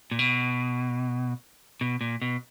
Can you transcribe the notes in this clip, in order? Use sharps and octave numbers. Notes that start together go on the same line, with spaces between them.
A#2
B2
B2
A#2
B2